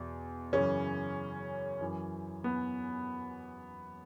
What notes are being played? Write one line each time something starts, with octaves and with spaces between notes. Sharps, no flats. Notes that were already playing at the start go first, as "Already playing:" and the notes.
Already playing: E2 B2
F#2 C#3 E3 C#4
F#2 E3
B3